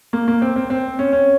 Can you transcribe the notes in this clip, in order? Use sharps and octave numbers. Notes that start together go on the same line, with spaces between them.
A#3
A#3
C4
C4
C4
C#4
C#4